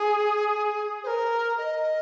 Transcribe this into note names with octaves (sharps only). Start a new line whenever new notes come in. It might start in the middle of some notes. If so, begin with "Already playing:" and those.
Already playing: G#4
C5
A#4
D#5